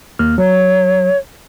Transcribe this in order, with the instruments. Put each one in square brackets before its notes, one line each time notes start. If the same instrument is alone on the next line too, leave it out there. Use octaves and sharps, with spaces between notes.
[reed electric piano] D#2 A#3 F6
[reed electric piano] F#3 [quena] C#5